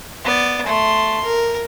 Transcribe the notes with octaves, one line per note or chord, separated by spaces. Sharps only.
B3 D5
A3 C6
A#4